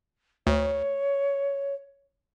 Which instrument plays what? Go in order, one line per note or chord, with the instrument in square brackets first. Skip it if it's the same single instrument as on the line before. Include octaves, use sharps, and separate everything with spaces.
[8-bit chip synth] D2 [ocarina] C#5